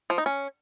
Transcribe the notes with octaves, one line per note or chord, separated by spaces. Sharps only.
F3
D#4
C#4